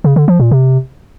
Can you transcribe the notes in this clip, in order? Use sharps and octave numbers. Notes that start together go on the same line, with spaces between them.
C#3
D3
F3
A#2
C3